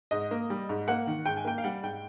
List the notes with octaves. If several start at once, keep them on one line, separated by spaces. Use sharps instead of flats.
G#2 D#5
A#3
G3
G#2
A#3 F#5
D#3
G#2 G5
G#5
A#3 G5
F5
G3 F#5
G#2 G5